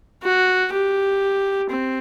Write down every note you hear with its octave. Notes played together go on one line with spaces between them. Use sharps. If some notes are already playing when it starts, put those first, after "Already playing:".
F#4
G4
C4